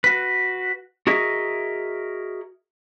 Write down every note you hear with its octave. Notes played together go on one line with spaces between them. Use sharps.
F#4 B4
F#4 G#4 A#4 D#5 E5